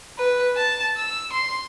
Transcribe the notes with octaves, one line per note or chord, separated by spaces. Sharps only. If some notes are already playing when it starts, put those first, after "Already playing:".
B4
A5
E6
C6